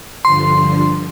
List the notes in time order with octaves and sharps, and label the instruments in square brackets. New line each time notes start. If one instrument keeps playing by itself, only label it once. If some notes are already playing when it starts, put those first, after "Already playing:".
[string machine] G2 D3 F3 [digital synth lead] C6